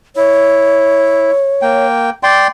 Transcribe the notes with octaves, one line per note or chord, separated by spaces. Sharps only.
E4 C#5
A#3 G5
D5 G5 C6